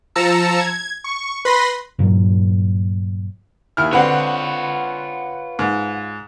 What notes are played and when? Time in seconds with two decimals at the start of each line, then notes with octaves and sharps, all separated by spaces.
0.15 F3 A5 A#5 E6 C#7
0.60 G#6
1.04 C#6
1.45 B4 B5 C6 A#6
1.99 G2 A#2 F#3
3.77 D#2 E4 F6
3.93 D3 C4 F4 B4 C#5 F#5
5.59 G#2